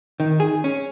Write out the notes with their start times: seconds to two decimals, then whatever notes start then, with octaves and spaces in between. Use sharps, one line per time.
0.20 D#3
0.40 G#4
0.64 C#4